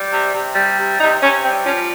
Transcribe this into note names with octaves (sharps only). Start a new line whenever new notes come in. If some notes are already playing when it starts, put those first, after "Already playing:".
Already playing: G3
C3
C3
G3
C3
C3 D#4
C3 C#4
G3 C4
F3 C#4